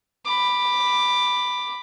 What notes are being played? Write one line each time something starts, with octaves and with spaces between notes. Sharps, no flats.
B5 D6